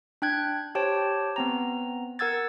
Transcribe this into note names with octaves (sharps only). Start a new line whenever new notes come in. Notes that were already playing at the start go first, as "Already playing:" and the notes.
D4 G5 F#6 G#6
G4 C5 C#5 G5 A5
B3 C4 A#5
A#4 F#5 E6 G#6 A6